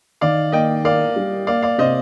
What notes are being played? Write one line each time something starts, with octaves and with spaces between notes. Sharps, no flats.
D#3 D5 F5
A#3 D#5 G5
A#4 D5 F5
G3
A#3 D5 F5
D5 F5
C3 C5 D#5